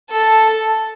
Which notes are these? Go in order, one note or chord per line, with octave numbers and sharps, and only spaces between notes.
A4